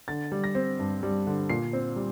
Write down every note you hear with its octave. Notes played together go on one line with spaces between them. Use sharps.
D3 A6
G3
A#6
C4
G2
G3
D3
A#2 C7
C4
G3